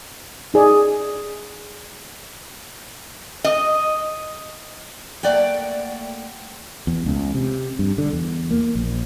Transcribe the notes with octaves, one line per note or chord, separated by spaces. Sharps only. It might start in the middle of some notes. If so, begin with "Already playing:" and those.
D#4 G#4 D5
D#5
A3 A#3 D5 F#5 G5
E2
C#2
C3
G2
D3
E2
A#3
A#1